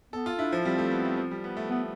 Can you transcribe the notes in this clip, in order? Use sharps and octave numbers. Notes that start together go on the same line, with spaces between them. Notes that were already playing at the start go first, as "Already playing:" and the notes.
B3 A4
F4
D4 E4
F3
G3 C4
A3
B3
A3
F3
G3
B3
A3
A3 B3